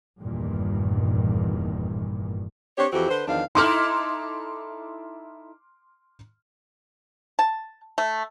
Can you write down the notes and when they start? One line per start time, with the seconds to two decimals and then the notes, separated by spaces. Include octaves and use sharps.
0.20 F1 E2 G2 A#2 D#3
2.78 C4 D4 G4 C#5
2.93 F2 E3 C4 F#4 G4
3.09 D3 B4 C5
3.28 E2 D#3 F3 D4 F5
3.55 D#4 E4 A4 C6 D6 F6
7.39 A5
7.98 A3